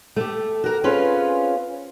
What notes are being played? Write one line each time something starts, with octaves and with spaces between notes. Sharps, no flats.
A3 G4
F#4 A#4
C4 C#4 F4 G#4 B4